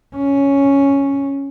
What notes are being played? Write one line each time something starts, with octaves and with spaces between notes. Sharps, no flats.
C#4